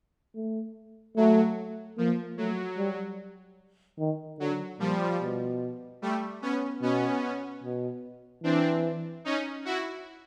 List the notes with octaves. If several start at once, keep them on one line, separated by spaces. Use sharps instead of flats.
A3
F#3 A3
F3 A#3
F#3 A3
G3
D#3
D3 F#3
A#2 F3 G3
B2
G3 A3
B3 C#4
B2 B3 C#4
B2
E3 C4 D4
C#4 D#4
E4 F#4